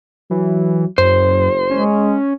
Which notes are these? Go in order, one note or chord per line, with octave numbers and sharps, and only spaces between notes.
E3 F#3
F#1 F#2 C5
G#3 C#4